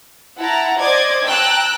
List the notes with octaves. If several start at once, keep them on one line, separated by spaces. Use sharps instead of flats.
E4 F#5 A5 A#5
C5 D5 D#5 D6 G#6
G5 A5 A#5 E6 F#6